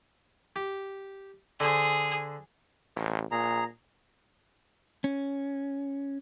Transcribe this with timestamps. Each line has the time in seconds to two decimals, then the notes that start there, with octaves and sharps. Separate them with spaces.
0.56 G4
1.60 D3 G#4 C5
2.96 A1
3.31 A#2 G#4 A#5
5.04 C#4